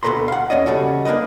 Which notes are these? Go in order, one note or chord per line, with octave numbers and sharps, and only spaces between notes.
D2 B2 A4 B4 A#5 C6
F5 F#5
E2 C#4 D5 D#5
C#3 G3 F#4 A4
A#3 D4 A#4 B4 D#5